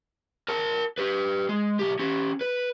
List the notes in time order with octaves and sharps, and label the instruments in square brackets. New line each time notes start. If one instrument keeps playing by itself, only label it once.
[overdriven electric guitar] A#4 A5
G4 B4
G#3
B1 G4
C#4 G4
B4